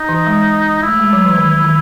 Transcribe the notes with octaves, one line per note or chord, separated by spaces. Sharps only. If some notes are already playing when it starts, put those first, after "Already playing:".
Already playing: D#4
E3
G#3
E4
A3
G#3
F#3
E3
D#3
D#3